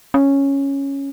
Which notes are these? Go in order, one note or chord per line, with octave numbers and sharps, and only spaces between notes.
C#4